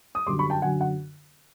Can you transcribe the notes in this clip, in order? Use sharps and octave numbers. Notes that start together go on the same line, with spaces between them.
D#6
F#2 D3 G3 C6 D6
B5 C#6
G5 A5
F#2 D3 F#3 F#5 G#5
F#5